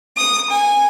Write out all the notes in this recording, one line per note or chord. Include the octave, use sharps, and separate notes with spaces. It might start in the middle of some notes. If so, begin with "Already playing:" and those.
D#6
G#5